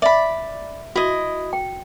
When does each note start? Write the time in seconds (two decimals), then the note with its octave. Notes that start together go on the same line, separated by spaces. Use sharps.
0.02 D5 E5 B5
0.96 E4 F#4 D#5
1.53 G5